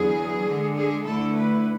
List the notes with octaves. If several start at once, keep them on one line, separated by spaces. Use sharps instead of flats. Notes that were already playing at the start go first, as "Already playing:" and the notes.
Already playing: E2 D3 F#3 G#4
D3 G#3 D4
G#4
D2 D3 A3 E4 A4
B4